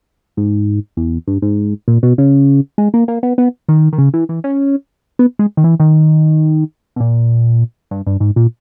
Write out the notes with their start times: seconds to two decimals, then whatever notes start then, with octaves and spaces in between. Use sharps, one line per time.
0.37 G#2
0.97 E2
1.27 G2
1.42 G#2
1.88 A#2
2.03 B2
2.18 C#3
2.78 G#3
2.94 A#3
3.08 A#3
3.23 B3
3.38 B3
3.68 D#3
3.93 D#3
3.98 C#3
4.14 E3
4.29 E3
4.44 C#4
5.19 B3
5.39 G#3
5.57 D#3
5.64 E3
5.80 D#3
6.96 B2
7.00 A#2
7.91 G2
8.06 G2
8.20 G#2
8.36 A#2